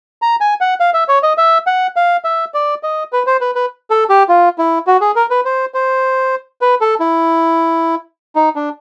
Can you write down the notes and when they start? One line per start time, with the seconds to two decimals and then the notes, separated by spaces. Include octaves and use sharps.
0.22 A#5
0.41 G#5
0.61 F#5
0.80 F5
0.94 E5
1.08 C#5
1.23 D#5
1.38 E5
1.67 F#5
1.96 F5
2.24 E5
2.54 D5
2.83 D#5
3.13 B4
3.27 C5
3.41 B4
3.55 B4
3.90 A4
4.10 G4
4.29 F4
4.58 E4
4.87 F#4
5.01 G#4
5.16 A#4
5.30 B4
5.45 C5
5.74 C5
6.61 B4
6.81 A4
7.00 E4
8.36 D#4
8.56 D4